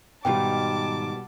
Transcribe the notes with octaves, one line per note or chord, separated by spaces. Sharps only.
G#2 B2 D#3 G3 F4 G5 A5 D6